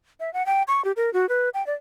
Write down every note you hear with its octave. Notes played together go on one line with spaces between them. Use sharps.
E5
F#5
G5
C#6
G4
A#4
F#4
B4
G5
D5